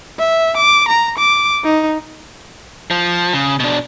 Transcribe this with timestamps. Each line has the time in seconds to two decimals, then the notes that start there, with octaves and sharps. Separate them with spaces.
0.19 E5
0.57 D6
0.88 A#5
1.18 D6
1.64 D#4
2.91 F3
3.33 C#3
3.60 B2 D4